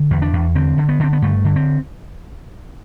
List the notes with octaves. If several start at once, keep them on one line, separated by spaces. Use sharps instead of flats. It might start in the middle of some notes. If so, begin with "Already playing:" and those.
Already playing: D3
E2
D4
E2
D3 C4
D3
B3
D3 C4
B3
G2 A3
D3
C4